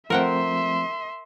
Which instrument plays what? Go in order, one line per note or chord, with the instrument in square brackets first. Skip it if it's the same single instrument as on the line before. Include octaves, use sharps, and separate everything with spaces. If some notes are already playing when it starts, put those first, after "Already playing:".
[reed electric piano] F3 A3 C4 [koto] A#4 F#5 G5 [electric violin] E5 C6